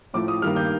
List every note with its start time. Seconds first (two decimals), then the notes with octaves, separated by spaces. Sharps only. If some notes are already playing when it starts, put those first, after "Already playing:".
0.14 A2 F3 A3 D6
0.28 D#6
0.42 G2 D#3 A#3 F6
0.56 G6